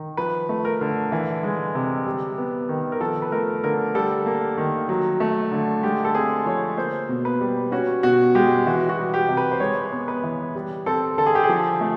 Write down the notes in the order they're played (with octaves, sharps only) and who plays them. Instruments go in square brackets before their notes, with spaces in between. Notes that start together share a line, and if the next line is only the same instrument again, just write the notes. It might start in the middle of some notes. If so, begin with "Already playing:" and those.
Already playing: [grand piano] D#3
F3 B4
A3
A#4
D3
E3
G#3
C3
G3
B3
D#3
A#4
F3 A4
B4
A3 A#4
D3 A#4
G3 A4
A#3
D#3
F#3
A3
D3
G#3 G4
A4
C4 G#4
F3 C#5
A#3 C5
B2
B4
G3
C#4 F#4
B2 F#4
G#3 G4
E3 F#4
F#4
G3
G4
C3
B4
C5
G#3 C#5
B3
B4
E3
G3
C4 A4
D3 A4
G#4
G4
G#4
F3
A3